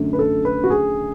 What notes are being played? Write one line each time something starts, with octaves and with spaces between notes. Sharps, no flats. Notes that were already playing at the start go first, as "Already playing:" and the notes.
Already playing: F#2 D3 A3
B4
A4
B4
F#4
G#4